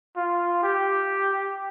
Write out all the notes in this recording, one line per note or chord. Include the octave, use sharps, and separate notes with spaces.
F4
G4